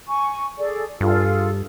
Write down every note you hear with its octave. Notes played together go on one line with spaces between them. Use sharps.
G#5 C#6
G#4 A4 D5
G2 F4 G#4 A4